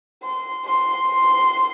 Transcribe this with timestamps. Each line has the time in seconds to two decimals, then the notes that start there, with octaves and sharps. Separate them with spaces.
0.23 C6
0.66 C6
1.08 C6